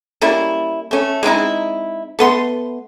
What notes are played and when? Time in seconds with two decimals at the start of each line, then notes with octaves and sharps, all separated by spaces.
0.21 G3 A#3 C#4 E4
0.91 A3 C#4
1.23 G#3 C4 D#4 E4
2.19 A3 B3 C6